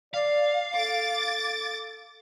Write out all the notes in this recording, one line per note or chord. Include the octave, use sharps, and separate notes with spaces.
D5 F5
A4 D6 A6